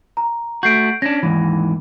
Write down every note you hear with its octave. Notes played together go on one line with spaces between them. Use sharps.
A#5
A3 F#4 G6 C7 D7
C#4 D4 A#6
D#2 G#2 E3